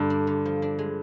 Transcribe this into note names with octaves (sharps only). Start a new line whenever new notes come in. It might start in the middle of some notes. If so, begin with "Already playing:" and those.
Already playing: G2 D3
D4
D3
F3
D4
G#3